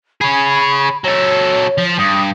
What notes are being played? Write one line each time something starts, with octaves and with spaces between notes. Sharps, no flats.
G#4 C#5 B5
F#3 A4 C#5
F3
G2 D#6